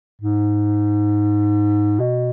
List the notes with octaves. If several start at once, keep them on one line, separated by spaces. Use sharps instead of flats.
G#2
B2